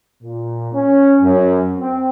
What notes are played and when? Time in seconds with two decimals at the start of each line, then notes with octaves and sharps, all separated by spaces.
0.23 A#2
0.73 C#4
1.21 F#2
1.78 C4